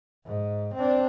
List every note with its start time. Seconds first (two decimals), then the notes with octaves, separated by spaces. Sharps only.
0.25 G#2
0.75 C4 D4